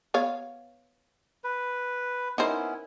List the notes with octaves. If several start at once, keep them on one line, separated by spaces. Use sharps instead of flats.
B3 C#5 F5
B4
B3 C#4 D#4 E4 A#4 C5